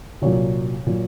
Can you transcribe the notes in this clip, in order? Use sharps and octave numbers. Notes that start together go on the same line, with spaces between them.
C2 A#2 F#3 C#5
A#2 F#3